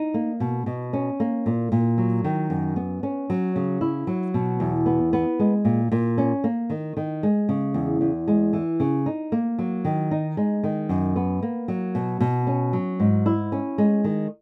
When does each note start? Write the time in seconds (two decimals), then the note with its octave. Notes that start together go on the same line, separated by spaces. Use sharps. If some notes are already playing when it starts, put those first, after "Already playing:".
Already playing: D#4
0.14 A#3
0.40 B2
0.66 B2
0.93 C#4
1.20 A#3
1.46 A#2
1.72 A#2
1.98 F#3
2.24 D#3
2.50 F#2
2.76 B3
3.03 C#4
3.30 F#3
3.56 C#3
3.81 E4
4.07 F#3
4.34 B2
4.60 E2
4.86 B3
5.13 B3
5.39 G#3
5.65 A#2
5.92 A#2
6.18 C#4
6.44 A#3
6.70 D#3
6.97 D#3
7.23 G#3
7.49 C#3
7.74 E2
8.01 E2
8.28 G#3
8.53 E3
8.80 C#3
9.06 D#4
9.32 A#3
9.59 F#3
9.85 D#3
10.11 D#4
10.37 G#3
10.63 D#3
10.89 F#2
11.16 B3
11.42 A#3
11.68 F#3
11.95 B2
12.21 B2
12.47 C#4
12.73 F#3
13.00 G#2
13.26 E4
13.52 C#4
13.78 G#3
14.04 D#3